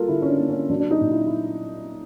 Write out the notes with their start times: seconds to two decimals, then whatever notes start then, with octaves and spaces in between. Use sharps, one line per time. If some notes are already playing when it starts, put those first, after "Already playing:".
Already playing: G3 A#3 F4 A4 A#4
0.08 D3 E4
0.22 C#4
0.28 D4
0.39 A#3
0.49 C#4
0.70 F#3 D4
0.80 D4
0.91 D#4
1.01 A#2
1.11 E4
1.26 E4